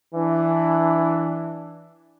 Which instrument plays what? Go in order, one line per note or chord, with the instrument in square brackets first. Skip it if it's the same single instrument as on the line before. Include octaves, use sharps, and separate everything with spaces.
[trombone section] E3 D4